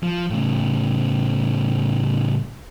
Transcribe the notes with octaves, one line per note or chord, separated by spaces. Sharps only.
F3
A2 C#3